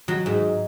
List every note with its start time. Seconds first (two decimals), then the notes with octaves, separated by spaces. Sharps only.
0.08 F#3
0.26 G#2